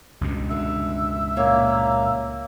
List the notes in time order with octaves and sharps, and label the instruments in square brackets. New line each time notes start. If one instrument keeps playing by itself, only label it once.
[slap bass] C#2 G2 B2
[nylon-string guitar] D3 [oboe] E5
[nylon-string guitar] A#2 C#5 [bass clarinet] A#3